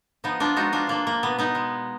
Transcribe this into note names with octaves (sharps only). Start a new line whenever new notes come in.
F3 B3 D#4
D4 F4
G#3 D#4 F#4
D4 F4
G#3 A#3 D4
A#3
B2 B3
B3 D#4
G#3